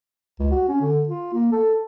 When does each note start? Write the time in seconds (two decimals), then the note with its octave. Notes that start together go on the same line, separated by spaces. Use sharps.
0.39 C#2
0.51 F#4
0.68 C#4
0.81 D3
1.09 F4
1.33 A#3
1.52 A4